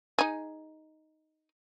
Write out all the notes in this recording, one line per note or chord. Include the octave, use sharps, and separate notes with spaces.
D#4 G#4